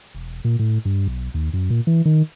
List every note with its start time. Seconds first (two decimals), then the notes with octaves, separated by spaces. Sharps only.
0.15 E1
0.44 A#2
0.59 A2
0.85 G2
1.07 B1
1.34 D#2
1.53 F#2
1.70 A#2
1.87 E3
2.05 D#3